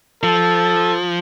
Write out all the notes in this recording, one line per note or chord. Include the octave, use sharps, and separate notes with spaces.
F3 A4